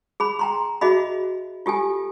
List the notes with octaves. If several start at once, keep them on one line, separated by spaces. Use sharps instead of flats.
G#4 B5
G5 A#5 C6
F#4 G#4 D#5 E5 B5
F4 G4 A4 G#5